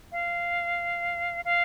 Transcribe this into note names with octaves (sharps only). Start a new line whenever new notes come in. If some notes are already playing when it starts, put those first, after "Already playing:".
F5
F5